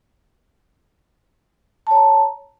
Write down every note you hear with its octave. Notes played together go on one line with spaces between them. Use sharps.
C#5 A5 A#5